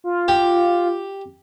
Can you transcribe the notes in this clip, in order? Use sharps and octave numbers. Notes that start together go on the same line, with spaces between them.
F4
G4